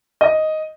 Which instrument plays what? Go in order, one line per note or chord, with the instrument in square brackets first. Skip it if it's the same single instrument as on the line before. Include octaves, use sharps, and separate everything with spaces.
[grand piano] D#5